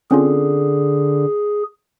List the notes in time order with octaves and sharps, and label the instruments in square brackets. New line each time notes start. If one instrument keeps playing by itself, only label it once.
[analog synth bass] D3 [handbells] C4 C#4 F4 [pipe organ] G#4